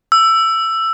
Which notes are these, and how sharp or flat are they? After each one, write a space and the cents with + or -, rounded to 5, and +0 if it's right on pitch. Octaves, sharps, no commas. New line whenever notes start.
E6 +10